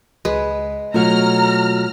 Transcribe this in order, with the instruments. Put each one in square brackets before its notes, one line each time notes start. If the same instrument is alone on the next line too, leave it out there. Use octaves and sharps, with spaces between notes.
[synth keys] C#2 [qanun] G#3 B4
[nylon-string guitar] B2 F#3 [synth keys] A3 F4 A4 [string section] A#5 F6